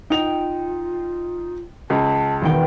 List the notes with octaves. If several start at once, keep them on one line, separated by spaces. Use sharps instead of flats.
D#4 F4 G5 F7
C#2 A5
E1 D#3 G5